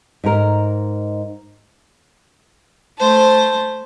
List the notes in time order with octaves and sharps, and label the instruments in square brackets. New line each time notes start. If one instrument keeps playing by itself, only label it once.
[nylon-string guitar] G#2 A#4
[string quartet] A3 C5 A5